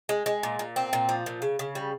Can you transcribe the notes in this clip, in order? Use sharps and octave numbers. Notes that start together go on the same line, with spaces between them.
G#3
G#3
A#2
A#2
C4
A#2
F3
A#2
C#3
C#3
G3